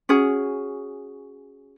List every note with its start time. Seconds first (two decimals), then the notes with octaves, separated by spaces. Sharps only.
0.09 C#4 F#4 G#4